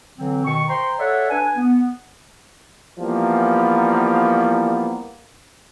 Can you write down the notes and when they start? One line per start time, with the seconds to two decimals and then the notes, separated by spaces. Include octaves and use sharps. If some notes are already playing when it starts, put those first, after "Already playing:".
0.18 D3 E3 F#3 C4
0.45 B2 D#3 C#6
0.68 C5 G5 A#5 C6
0.99 A4 C#5 D5 E5 F#5
1.30 D4 B4 G#5
1.57 B3
2.99 E3 F3 G3 A#3 B3